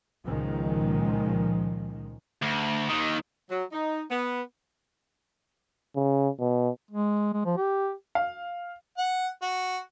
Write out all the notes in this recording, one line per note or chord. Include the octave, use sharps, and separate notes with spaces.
C#2 A#2 D#3 F3 G#3
D2
D#2 D#3
F#3
D#4
B3
C#3
B2
G#3
G#3
F3
G4
F5
F#5
F#4